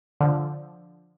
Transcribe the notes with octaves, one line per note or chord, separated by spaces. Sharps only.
D3 F3